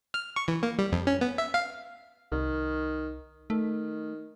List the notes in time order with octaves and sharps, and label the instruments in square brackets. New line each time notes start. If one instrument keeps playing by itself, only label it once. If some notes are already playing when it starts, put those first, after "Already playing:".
[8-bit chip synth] F6
C#6
E3
A#3
G3
F2
C#4
B3
E5
F5
[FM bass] C2 [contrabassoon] D#3
[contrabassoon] D#3 [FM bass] A3